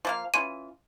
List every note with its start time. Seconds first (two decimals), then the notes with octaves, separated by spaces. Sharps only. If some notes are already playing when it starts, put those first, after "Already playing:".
0.05 F3 A#3 F5
0.34 E3 C#4 F4 D#7